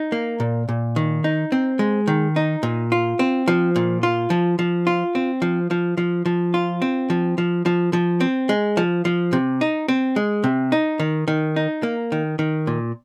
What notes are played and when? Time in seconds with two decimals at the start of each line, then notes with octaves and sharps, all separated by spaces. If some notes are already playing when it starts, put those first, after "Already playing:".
Already playing: D#4
0.12 A#3
0.40 A#2
0.69 A#2
0.96 D#3
1.24 D#4
1.52 C4
1.79 G#3
2.07 D#3
2.36 D#4
2.63 A#2
2.92 F4
3.19 C4
3.48 F3
3.76 A#2
4.03 F4
4.30 F3
4.59 F3
4.87 F4
5.15 C4
5.42 F3
5.71 F3
5.97 F3
6.26 F3
6.54 F4
6.82 C4
7.10 F3
7.38 F3
7.66 F3
7.93 F3
8.21 C4
8.49 G#3
8.77 F3
9.05 F3
9.33 C3
9.61 D#4
9.88 C4
10.16 G#3
10.44 C3
10.72 D#4
11.00 D#3
11.28 D#3
11.56 D#4
11.83 A#3
12.12 D#3
12.39 D#3
12.67 A#2